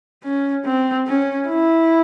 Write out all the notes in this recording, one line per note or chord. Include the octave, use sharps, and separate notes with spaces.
C#4
C4
C#4
E4